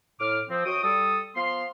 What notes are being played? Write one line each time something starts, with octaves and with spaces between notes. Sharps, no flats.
A2 D6 F6
F3 C4
F#2 F#4 G5 D#6
G3 A4 D#6
F3 B3 F5 C6